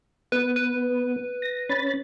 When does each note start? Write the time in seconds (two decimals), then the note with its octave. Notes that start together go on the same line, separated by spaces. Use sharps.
0.32 B3 B4
0.56 B4
1.42 A#6
1.69 C#4 B5 A6